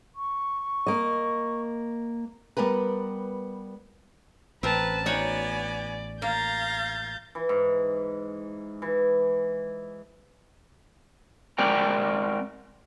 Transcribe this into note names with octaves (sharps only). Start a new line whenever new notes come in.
C#6
A#3 D#5
G3 B3 G4 A#4 B4
A1 C4 A#4 B4 A5
B3 D#4 F#4 C#5 D5 G#5
A#3 F5 A#5 G6 A6
E3
G#2
E3
G#3 C4 A#4 D5 G5 A#5